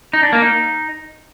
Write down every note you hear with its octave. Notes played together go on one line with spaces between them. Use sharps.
D#4
D4
A#3
D#4